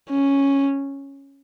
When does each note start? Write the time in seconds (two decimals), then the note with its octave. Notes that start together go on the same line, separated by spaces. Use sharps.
0.10 C#4